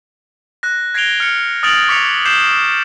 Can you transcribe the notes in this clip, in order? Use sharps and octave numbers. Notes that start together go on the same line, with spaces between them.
F#6 A#6
G#6 A#6 C7 D7 F7 G7
F6 C#7
D#6 F6 A6 D7 F7 F#7
C#6 D6 B6 C#7 F7
D6 G6 C7 E7 G7